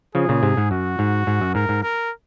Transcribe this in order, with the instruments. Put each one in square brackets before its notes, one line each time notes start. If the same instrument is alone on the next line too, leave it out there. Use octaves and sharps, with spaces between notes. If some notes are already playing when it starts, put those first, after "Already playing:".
[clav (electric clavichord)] C#3 F3 [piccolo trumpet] G#4
[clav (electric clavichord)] A#2 C#3
G#2 C3
G#2
[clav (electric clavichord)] F#2 [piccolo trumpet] F#4
[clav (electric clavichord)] G#2
G#2
F#2
[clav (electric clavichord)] G#2 [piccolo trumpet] A#4
[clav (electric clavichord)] G#2
[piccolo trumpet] A#4